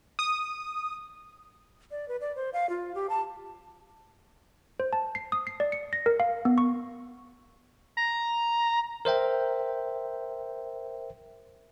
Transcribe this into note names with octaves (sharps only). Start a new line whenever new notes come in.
D#6
D5
B4
D5
C5
F5
F4
G4
A5
C5
A5
C7
D#6
C7
D5
C#7
A#6
A#4
F5
B3
C#6
A#5
A#4 C5 E5 G5